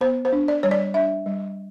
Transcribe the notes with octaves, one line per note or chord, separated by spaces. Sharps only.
B3 C5
C5
D4
D5
G3 C#5
D5
D4 E5
G3